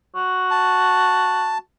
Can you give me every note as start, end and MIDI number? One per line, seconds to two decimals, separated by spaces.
0.16 1.58 66
0.51 1.58 81